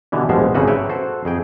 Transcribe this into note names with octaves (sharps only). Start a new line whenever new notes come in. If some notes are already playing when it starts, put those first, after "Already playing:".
B2 D3 E3 G3
A#1 B2 F3 G3 G#3 C5
G#1 C#3 A#3 F#4 A4 B4
B4 C#5 E5 G5
F#4 A4 C5
F2 G#4 G5